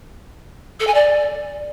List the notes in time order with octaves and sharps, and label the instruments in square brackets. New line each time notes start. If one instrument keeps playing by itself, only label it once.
[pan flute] A4
G#5
D5